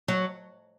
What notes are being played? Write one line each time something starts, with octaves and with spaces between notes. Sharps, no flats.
F#3